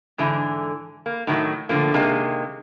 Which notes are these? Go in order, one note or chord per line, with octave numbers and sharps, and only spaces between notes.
G#2 D3 E3
A#3
A2 D#3 F#3
A2 D3 F3 A#3
C3 D#3 G#3 A#3